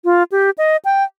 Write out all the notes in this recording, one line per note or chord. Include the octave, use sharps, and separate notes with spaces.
F4
G4
D#5
G5